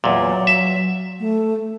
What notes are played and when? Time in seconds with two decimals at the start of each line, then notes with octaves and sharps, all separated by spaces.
0.04 E2 A#2 F#3
0.47 E5
1.20 A3